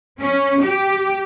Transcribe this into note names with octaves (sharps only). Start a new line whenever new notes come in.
C#4
G4